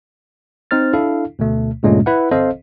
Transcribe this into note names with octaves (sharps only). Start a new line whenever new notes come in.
C4 D#4 C5 F6 A6
D4 E4 A4 F5
D2 B2 A3
C#2 G2 A#2 G#3 A3 C#4
E4 B4 F#5
G1 C4 A4 C5 D#5 F5